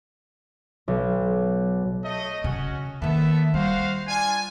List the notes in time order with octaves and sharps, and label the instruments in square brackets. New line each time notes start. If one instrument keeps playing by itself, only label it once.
[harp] B1
[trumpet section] A3 D#5
[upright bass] C#3 [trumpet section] C#4 F#4
[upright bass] D#3 A#3 [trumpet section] B3 A4 E5
[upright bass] G3 [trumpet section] F#4 C5 F5
[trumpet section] D4 F4 G#5